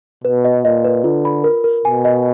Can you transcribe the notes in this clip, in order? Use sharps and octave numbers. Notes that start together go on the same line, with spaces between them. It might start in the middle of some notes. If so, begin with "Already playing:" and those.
B2 B4
D#5
A#2 D#5
B4
D3 F4
B5
A#4
A#4
B2 G#5
D#5